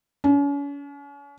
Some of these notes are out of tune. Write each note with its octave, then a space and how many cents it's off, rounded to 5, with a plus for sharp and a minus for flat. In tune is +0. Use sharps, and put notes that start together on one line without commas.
C#4 +40